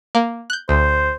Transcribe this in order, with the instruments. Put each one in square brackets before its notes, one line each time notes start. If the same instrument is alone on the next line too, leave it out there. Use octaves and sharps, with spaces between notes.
[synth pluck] A#3
F#6 G6
[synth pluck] D2 [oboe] C5